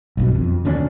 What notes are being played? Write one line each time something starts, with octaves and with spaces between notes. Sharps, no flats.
B1 G2 B2
F2
D#1 D2 C#4 D4